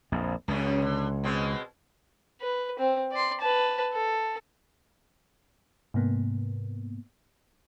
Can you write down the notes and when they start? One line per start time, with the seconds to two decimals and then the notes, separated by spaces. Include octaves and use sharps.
0.12 A#1 F2
0.48 C#2 F#2 C#3 C#4
0.82 D3
1.24 B2 G#3 C4
2.42 B4
2.79 C4
3.12 D5 C6
3.40 B4 A5
3.94 A4
5.94 G#2 C3 A#3 B3